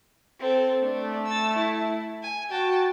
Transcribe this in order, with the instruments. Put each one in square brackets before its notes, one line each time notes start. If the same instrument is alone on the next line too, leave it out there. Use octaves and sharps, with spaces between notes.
[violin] C4 A4
[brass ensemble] A3 [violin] D4
[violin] E6 A6
E4
G#5
[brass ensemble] F#4 [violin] G5 A5